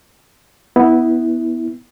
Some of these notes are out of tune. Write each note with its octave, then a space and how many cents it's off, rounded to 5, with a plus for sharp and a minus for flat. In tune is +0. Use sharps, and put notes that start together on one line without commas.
B3 +0 E4 -15